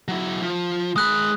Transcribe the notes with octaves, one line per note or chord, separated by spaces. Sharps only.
F#3 E4
F3
G#3 B5 D#6 F#6